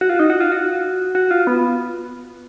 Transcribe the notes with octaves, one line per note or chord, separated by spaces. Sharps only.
F#4
F4
D#4
F#4
F4
F#4
F#4
F4
B3